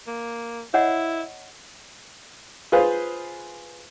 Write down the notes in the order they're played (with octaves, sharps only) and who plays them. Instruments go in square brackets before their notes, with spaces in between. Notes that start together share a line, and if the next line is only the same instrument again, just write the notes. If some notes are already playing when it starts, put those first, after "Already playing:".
[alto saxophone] A#3
[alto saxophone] E4 [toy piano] C#5 D#5 F#5
[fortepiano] F4 G#4 B4 C5